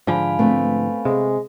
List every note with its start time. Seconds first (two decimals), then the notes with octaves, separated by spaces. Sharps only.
0.07 G#2 D3 F3 F5 G#5 B5
0.39 A3 B3 C4
1.05 C3 G#3